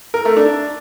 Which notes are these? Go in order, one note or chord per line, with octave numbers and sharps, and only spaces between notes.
A#4
A3
D4